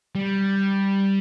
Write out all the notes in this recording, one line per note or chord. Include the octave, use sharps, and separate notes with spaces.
G3